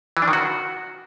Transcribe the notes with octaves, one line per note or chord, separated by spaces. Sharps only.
E3
D4
D#3
F#4